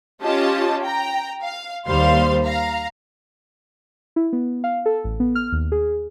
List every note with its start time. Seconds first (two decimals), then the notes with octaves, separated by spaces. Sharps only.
0.23 C#4 F4 G4 D#5 A5
0.83 G5 A#5
1.43 F5
1.87 D#2 G3 C5 F5 C6
2.44 F5 A#5
4.16 E4
4.33 B3
4.64 F5
4.86 A4
5.04 A1
5.20 B3
5.35 F6
5.52 D#2
5.72 G#4